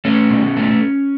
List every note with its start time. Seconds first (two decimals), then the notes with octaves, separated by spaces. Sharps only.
0.05 A3 C#4
0.30 B2
0.57 A3